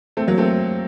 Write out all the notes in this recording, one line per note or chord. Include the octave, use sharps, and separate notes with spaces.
A3 C4
F#3 A#3
A3 C4